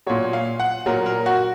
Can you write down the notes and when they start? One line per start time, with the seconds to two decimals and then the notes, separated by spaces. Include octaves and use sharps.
0.07 A#2 F#3 C#5
0.33 F5
0.60 F#5
0.86 A#2 F#3 A#4
1.06 A#4
1.26 F#4